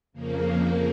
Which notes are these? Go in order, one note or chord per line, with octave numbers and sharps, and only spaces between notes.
F2 C#3 F3 A#3